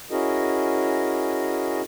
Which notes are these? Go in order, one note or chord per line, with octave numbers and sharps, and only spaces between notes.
C#4 E4 F#4 G#4 A#4 D#5